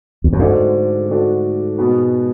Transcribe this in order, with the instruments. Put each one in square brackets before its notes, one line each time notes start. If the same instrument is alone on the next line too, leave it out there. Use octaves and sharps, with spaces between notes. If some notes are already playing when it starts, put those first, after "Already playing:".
[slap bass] E2
F#2
[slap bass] G#2 [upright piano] D3 A3 D4 F#4
[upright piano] D3 A3 D4 F#4
B2 G#3 B3 F#4